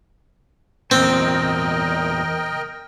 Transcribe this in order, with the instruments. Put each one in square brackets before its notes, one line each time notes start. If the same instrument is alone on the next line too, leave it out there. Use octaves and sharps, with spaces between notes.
[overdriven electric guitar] E2 A#2 [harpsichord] C4 [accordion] A#4 D#5 G5